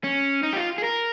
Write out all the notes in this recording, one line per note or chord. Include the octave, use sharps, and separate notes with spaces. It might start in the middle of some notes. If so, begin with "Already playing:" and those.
C#4
D#4
G4
F4
G#4
A#4